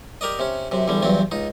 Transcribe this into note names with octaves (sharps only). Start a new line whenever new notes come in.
G4 A#4 D5 D#5
C3 C#4
F#2 C3
E2 D3 G3
E2 G2 F#3 C4
C#2 D#4